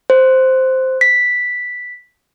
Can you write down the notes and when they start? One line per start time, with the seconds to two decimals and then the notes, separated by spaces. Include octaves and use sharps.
0.10 C5
1.01 B6